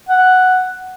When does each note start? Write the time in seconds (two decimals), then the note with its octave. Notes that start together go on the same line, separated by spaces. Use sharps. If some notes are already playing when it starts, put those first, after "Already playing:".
0.09 F#5